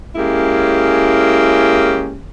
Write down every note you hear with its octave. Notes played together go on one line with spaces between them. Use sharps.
G#3 A#3 C#4 E4 G4